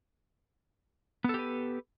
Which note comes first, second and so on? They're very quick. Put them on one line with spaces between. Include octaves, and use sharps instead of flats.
B3 A4 G4 B4